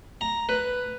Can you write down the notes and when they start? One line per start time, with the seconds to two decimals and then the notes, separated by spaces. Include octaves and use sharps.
0.21 A#5
0.49 B4